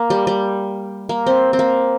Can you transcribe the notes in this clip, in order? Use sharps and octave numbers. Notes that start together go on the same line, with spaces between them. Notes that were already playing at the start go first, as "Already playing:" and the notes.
Already playing: A#3
G3
G3
A#3
C4
C4
A#3